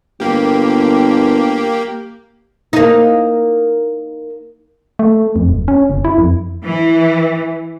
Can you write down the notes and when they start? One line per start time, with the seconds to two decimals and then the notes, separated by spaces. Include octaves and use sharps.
0.20 G1 A#3 G4
2.73 A#3 D#4
4.99 A3
5.36 F2
5.49 D#1
5.68 C#4
5.90 F#1
6.05 E4
6.18 F2
6.64 E3